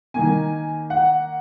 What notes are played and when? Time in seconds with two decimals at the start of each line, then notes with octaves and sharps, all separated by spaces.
0.14 D#3 A#3 G#5
0.90 F#5